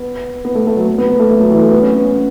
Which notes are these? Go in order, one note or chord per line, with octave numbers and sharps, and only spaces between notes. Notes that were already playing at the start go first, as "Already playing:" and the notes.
Already playing: B3
B3
A3
A3
F#3
B3
B3
B3
A3
A3
F#3
E3
A3
B3
C#4
B3
C#4